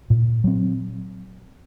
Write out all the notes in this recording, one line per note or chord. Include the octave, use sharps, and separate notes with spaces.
A#2
F#3 C4